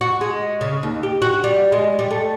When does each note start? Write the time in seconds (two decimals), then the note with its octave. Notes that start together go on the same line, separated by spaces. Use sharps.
0.01 F#4
0.21 G#3
0.61 C#3
0.83 D#2
1.03 G4
1.22 F#4
1.44 G3
1.72 G#3
1.99 G3
2.11 A3